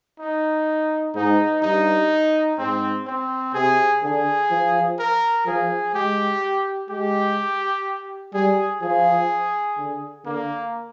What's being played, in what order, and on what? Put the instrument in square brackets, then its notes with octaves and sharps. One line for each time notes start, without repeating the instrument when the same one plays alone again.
[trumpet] D#4
[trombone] G#2 [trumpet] D#4
[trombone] G2 [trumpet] D#4
[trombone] G#2 [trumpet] C4
[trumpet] C4
[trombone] C3 [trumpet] G#4
[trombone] D3 [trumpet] G#4
[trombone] F3
[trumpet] A#4
[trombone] F3 [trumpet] G#4
[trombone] G#3 [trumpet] G4
[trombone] G#3 [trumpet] G4
[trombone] G3 [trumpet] G#4
[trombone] F3 [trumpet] G#4
[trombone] D3
[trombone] D3 [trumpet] A#3